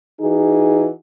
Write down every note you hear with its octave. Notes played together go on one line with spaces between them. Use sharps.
E3 D#4 F#4 G#4